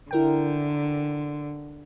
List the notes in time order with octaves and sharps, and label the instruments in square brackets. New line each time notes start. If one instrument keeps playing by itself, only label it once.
[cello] D3 [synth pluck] E4 A#4 G5